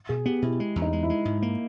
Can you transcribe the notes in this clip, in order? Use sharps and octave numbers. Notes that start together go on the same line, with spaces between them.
B2 G#4
B3 G4
B2 E4
G#3
E2
D#4
G#3
E4
G#3
G#2
A#3